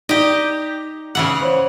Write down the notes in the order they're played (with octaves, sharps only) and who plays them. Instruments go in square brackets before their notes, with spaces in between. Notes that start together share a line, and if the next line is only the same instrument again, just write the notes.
[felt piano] D#4 D5 [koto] G4 D#5
[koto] C#3 E3 F#5
[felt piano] C5 C#5